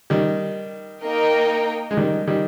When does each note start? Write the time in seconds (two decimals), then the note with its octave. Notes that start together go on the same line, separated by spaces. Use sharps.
0.10 D#3 G3
1.03 A#3 D#4 A#4 D#5 G5
1.91 G#3
1.97 D#3 G3
2.27 D#3 G3